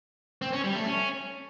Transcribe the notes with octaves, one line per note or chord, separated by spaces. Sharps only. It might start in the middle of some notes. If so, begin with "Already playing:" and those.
C4
C#4
G3
A3
C#4